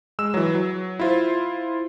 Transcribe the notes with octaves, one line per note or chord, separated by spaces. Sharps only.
G#3 E6 E7
E3 F#3
F#3
E4 F4 C5